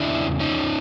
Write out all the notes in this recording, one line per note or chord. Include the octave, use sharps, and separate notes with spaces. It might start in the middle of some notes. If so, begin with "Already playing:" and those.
Already playing: E2 C#3 D4 E4
C#4 D#4